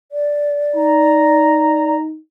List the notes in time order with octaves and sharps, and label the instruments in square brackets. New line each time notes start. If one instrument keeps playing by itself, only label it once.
[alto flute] D5
[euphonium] D#4 [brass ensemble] A#5